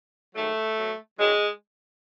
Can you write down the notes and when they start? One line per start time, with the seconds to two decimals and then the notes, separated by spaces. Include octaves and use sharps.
0.35 G#2 D#3 F#3 A3
0.78 B2 F#3
1.18 F#2 D#3 F#3 G#3